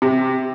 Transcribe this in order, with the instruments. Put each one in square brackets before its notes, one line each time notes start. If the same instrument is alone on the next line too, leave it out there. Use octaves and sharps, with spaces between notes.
[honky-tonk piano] C3